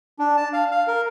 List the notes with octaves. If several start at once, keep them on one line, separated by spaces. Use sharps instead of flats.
D4
A5
F5
F5
A#4